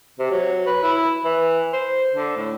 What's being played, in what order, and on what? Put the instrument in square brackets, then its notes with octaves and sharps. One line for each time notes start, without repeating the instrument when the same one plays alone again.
[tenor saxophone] C3
F#3
B4
E4
E3
C5
D3
A2